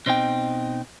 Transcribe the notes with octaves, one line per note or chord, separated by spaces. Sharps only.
B2 C4 D#4 G5